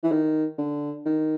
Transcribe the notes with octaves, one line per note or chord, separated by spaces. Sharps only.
E3
D#3
D3
D#3